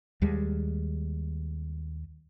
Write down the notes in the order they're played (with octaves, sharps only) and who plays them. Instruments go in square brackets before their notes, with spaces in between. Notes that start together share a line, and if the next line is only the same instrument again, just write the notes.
[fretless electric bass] D#2 G3 G#3